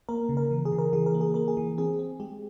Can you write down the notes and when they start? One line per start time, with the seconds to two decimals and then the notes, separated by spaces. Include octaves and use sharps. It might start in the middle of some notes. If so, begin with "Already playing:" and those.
0.09 A#3 A#4
0.29 C#3
0.37 A#4
0.51 E3
0.65 G#4
0.72 C#3
0.79 A#4
0.93 E3 G#4
1.06 A#4
1.14 A#3
1.21 G#4
1.34 A#3 A#4
1.48 G#4
1.57 E3
1.78 C4 G#4
1.99 C4
2.20 G#3 G4